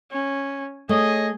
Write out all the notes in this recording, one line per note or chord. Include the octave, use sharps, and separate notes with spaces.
C#4
A3 G#4 C#5 D#5